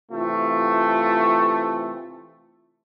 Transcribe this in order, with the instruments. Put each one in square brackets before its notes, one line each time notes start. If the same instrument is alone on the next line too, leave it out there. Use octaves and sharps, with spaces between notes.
[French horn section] C3 E3 F4 [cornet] A3